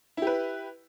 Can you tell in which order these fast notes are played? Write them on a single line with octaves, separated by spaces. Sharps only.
E4 G4 B4